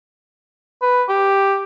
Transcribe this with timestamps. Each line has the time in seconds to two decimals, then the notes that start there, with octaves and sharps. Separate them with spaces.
0.82 B4
1.09 G4